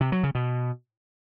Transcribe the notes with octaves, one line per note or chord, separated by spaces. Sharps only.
C3
F#3
C#3
B2